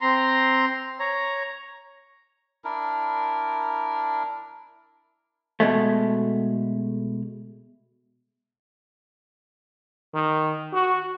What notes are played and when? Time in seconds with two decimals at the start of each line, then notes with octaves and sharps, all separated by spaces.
0.01 C4 A#5 C6
1.00 C#5 A#5
2.64 D4 E4 A#4
5.60 B2 G#3 A3
10.15 D#3
10.73 F#4